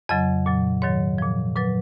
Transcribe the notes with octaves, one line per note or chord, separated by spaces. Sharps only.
F2 C#3 F#3 D#5
A#2 F#3
G#2 D#3 F#3 C#5
A#2 F3
A#2 F#3 B4